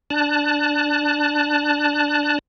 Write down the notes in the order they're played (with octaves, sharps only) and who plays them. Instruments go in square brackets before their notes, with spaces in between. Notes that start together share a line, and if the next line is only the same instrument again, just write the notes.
[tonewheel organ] D4 A5 F#6